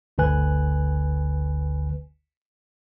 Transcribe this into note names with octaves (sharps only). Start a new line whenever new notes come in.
G1 D2 D3 B4 G#5 F#6